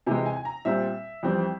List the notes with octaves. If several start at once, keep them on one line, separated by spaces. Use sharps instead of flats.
C3 E3 G#3 G#5
G#5
G#5
A#5
A#2 G3 C4 E5
F2 E3 G3 C4